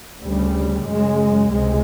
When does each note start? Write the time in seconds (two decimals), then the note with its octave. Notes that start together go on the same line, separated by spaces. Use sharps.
0.23 D2 C#3 G3
0.86 F#2 C#3 G#3
1.50 C#2 C3 G#3